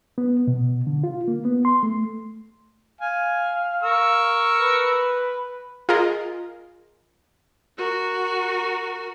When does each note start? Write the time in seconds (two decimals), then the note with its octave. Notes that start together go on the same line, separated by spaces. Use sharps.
0.18 B3
0.47 B2
0.87 D3
1.04 F4
1.28 A#3
1.45 B3
1.65 C6
1.83 A3
3.01 F5 G#5
3.83 A#4 C#6 E6
4.61 B4
5.89 F4 G#4 A#4 D#5
7.78 F#4 A#4